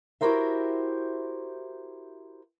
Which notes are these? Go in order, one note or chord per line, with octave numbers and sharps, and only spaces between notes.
E4 F#4 G4 A#4 C5 E5